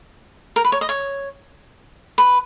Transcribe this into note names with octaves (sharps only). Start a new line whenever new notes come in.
A#4
B4
C#5
D#5
C#5
B4